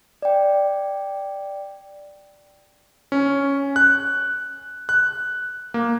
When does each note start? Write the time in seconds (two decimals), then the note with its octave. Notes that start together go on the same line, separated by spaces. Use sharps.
0.22 D5 G5
3.12 C#4
3.76 F#6
4.89 F#6
5.74 A#3